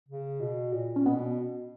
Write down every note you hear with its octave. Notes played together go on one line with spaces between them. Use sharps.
C#3
B2
A#2
C#4
B2 B3